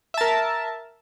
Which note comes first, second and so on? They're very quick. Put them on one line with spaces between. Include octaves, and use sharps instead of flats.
E5 A5 A#4